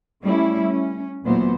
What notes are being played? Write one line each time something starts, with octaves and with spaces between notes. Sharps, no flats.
G3 A3 C#4 E4
C#4
D2 A#2 E3 F#3 B3 C5